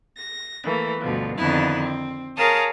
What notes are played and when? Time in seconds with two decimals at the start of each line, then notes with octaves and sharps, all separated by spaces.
0.16 A#6
0.63 E3 A3 A#3
1.01 D2 G2 B2 D3 F3
1.37 F2 D3 D#3 B3 D#4 E4
1.80 C4
2.37 G#4 A#4 C#5 F5 A5 D#6